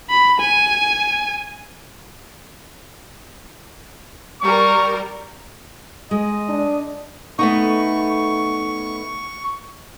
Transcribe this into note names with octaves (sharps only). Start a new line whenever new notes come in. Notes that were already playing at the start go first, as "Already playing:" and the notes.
B5
G#5
G3 A#4 C#6
G#3 D#5
D4
A3 B3 D#4 C#6